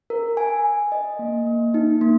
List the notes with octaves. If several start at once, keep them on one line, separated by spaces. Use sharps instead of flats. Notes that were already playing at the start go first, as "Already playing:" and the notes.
A#4
G#5
G#5
D#5
A#3
A#3
D#4
A#3